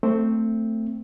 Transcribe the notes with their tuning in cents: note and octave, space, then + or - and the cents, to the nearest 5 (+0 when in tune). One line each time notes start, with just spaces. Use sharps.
A3 +20 C4 +0